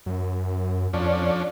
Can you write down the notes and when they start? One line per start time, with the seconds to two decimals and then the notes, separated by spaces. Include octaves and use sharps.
0.06 F#2
0.93 F2 F3 C#4 D4